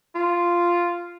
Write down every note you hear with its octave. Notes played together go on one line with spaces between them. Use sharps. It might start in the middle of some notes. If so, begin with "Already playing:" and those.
F4